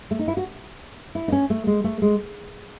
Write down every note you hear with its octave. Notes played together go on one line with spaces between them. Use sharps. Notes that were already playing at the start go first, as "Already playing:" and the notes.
A3
D#4
E4
F#4
E4
D#4
C#4
A3
G#3
A3
G#3